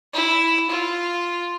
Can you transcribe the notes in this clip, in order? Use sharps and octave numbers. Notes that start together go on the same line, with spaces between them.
E4
F4